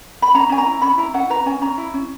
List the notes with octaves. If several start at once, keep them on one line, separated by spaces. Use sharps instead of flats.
B5
C#4 A#5
C#4 G#5
A#5
E4
C#4 B5
E4 A#5
C#4 F#5
B4 A#5
C#4 G#5
C#4 A#5
E4
C#4